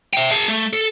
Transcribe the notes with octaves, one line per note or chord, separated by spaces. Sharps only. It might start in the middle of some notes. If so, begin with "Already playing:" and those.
E5 G5
G#4 A5
A3
A4